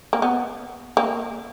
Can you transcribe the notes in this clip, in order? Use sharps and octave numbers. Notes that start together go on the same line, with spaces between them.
A#3
B3
A#3